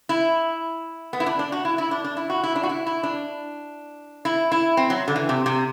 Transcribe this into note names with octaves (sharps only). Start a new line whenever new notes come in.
E4
B3
E4
D4
D4
F#4
E4
E4
D4
D4
E4
F#4
E4
D4
F#4
E4
E4
D4
E4
E4
C4
F#3
D3
E3
C3
C3